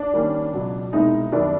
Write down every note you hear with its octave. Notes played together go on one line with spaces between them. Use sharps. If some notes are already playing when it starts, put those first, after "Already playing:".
Already playing: D4
D#3 G3 A#3 C#4
C#2 B2 F#3
C2 B2 G#3 B3 D#4 E4
F#2 D#3 G3 B3 D4